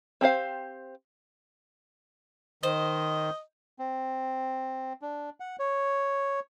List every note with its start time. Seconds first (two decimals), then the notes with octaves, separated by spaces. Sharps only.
0.21 C4 G4 C5 F5
2.63 D#3 C5 D#5
3.79 C4
5.02 D4
5.40 F#5
5.59 C#5